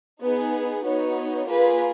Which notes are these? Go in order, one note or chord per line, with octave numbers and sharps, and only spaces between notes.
B3 D#4 G#4
B3 D#4 F#4 C#5
A#3 F4 G#4 B4